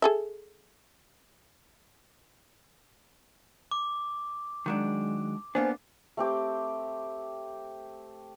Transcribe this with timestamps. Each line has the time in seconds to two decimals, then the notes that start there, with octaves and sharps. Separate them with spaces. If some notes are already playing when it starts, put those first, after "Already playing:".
0.02 G#4 A4 E5
3.71 D6
4.66 D#3 F#3 G#3 D4
5.55 A#3 B3 D4 C5 G#5
6.17 A3 C4 G4 D6